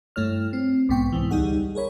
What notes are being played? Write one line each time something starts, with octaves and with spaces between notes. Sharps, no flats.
G2 A3 E4 C#5 F6
C4
B1 G#2 B3 G5 C#6
C2 G#2 E3
D2 G3 D#4 G#4 F#5
G#4 A#4 C#5 B5